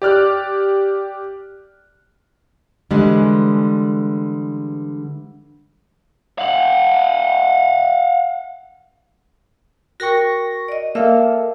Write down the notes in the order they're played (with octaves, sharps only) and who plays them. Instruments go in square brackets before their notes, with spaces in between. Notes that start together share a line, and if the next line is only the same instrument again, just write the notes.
[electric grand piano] G4 D5 F6 F#6
[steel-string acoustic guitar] D3 E3 G3 G#3
[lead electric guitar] F5 F#5
[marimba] F#4 A#4 G5 [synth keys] C#6 A#6
[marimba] D5 D#5
[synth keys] A#3 A4 [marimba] E5 F5